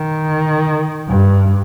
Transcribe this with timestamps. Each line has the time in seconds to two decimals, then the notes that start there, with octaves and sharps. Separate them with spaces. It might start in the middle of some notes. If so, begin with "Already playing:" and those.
Already playing: D#3
1.09 G2